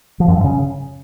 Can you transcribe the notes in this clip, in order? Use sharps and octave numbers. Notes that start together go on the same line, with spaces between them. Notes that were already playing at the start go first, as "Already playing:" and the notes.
F3
F#2
G2
C#3